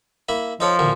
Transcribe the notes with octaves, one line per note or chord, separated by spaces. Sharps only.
A#3 E4 B5
F3 D#4 A4 C#5
A1 D2 A#2